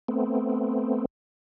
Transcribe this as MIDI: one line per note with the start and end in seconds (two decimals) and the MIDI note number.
0.08 1.05 57
0.08 1.05 59
0.08 1.05 60